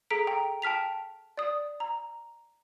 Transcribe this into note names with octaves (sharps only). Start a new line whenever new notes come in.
G#4 A4 A#5 B6 D7
G5 A#5
G5 A5 F6 B6 F7
D5 D#6
A#5